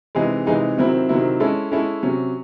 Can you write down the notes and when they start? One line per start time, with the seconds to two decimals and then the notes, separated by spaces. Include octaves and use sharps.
0.15 C3 E3 G#3 D#4 G#4
0.46 C3 E3 G#3 D#4 G#4
0.77 C3 D#3 F#3 C4 E4
1.09 C3 D#3 F#3 C4 E4
1.40 G#3 C#4 E4 A4
1.72 G#3 C#4 E4 A4
2.03 C3 F#3 C#4